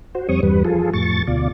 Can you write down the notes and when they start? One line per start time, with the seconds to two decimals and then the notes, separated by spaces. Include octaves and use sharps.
0.15 F#4 C5
0.29 F2 G3 C4 C#5 C#6 D#6
0.43 E2 G2 G3 B4
0.65 F3 F4 G#4 A4
0.93 F2 A2 C#6 A6
1.27 D2 B2 F4 D5